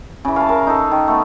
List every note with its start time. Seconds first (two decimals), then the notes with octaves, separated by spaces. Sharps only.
0.25 C#3 E3
0.36 F5 A5
0.49 A#4
0.67 D#4 A4
0.91 D#3
1.08 A3 B3